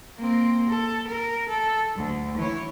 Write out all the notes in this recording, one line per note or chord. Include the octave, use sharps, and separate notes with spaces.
A#3 C4
A4
A#4
A4
D2
E3 C#5